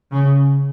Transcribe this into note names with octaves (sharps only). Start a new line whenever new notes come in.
C#3